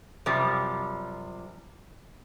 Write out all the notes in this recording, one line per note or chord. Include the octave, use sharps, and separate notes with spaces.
F#2 C3 F3 G3